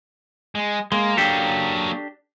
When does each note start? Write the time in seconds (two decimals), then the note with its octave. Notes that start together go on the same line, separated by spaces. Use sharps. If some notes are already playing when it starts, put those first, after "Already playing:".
0.55 G#3
0.92 G#3 A#3
1.17 F#3 A#3 D4 G4 A4